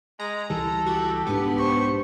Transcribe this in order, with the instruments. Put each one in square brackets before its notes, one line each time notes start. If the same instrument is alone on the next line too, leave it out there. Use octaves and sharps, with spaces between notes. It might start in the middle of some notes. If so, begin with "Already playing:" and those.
[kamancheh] G#3 [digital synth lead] A#5
[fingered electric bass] C#2 E3 G3 [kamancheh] A4
[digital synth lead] F#4 [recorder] G4
[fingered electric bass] B1 G#2 D4 [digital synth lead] B3
[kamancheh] C5 C#6